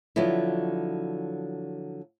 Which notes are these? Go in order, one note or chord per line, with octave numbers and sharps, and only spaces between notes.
D3 F3 F#3 B3 E4